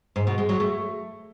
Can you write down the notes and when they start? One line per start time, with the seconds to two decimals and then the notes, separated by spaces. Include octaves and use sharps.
0.16 G#2
0.27 B2
0.38 G#3
0.49 F#3
0.60 A3